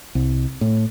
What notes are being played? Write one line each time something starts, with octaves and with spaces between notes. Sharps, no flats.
C2
A2